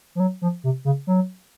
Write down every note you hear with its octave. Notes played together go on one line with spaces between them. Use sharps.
F3
F#3
F3
C3
C#3
F#3